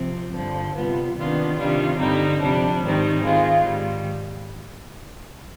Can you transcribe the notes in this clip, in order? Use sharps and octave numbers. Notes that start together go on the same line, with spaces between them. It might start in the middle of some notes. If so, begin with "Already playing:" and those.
Already playing: C3 F3 C4
G2 D3 F3
C3 G3 B3 F4
C3 D#3 B3 D4 F4
C3 D#3 G3 D4 F4
G2 D3 G3 C4 D#4
F2 C3 G3 D4
G#2 D#3 G3 C4 D#4
D#3 G#3 C4 F4
G#2 D#3 G3